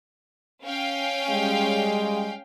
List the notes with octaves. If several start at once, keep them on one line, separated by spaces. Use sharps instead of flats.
C#4 F5 G5
G3 G#3